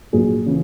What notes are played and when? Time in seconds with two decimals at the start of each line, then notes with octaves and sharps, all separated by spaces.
0.13 A#1 A#2 F#3 G#4
0.46 C#3 E3